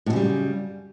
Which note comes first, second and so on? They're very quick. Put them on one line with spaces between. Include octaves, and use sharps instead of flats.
A2 F#2 C#3 G3